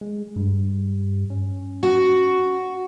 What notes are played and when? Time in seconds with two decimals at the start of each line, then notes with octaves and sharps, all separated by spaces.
0.01 G#3
0.36 G2
1.30 C#4
1.83 F#4